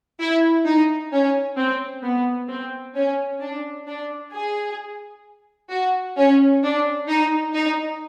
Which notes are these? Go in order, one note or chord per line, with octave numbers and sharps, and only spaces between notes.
E4
D#4
C#4
C4
B3
C4
C#4
D4
D4
G#4
F#4
C#4
D4
D#4
D#4